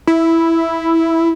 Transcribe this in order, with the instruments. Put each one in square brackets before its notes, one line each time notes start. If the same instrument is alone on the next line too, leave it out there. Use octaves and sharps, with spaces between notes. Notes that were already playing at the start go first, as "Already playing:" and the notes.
[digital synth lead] E4